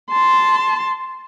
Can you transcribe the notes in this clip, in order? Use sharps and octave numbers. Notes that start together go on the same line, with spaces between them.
A5 C6